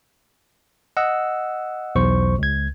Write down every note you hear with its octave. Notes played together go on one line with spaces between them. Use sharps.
D#5 F#5 E6
B1 E2 C5 C#6
C#2 G#6